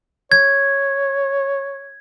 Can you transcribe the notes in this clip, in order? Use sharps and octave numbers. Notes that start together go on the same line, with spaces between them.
C#5 G#6